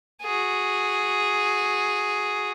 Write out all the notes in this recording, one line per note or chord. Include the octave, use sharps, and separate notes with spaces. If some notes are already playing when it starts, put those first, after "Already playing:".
F#4 G#4